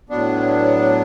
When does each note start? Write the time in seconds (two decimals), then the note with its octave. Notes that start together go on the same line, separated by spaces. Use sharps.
0.09 A2 F#3 B3 D4